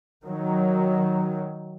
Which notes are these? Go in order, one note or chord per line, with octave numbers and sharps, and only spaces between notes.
D#3 F#3